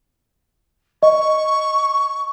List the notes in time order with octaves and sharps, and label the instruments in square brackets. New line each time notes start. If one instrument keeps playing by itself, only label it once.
[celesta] D#5 [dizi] C#6